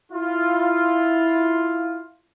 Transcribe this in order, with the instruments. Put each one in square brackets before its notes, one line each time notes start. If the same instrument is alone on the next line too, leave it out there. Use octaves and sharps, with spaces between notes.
[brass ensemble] E4 F4